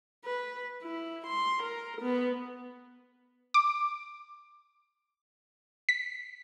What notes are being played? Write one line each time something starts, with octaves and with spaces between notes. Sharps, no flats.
B4
E4
C6
A#4
B3
D6
B6